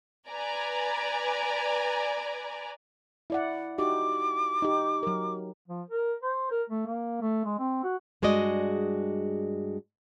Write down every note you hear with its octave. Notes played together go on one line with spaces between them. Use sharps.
B4 D5 G#5 A#5
E4 D5 F#5
D#4 F#4 G4 D6
D#4 G4
F#3 A#4
F3
A#4
C5
A#4
A3
A#3
A3
G#3
C4
F#4
G2 G#3 F#4 G#4 D5 D#5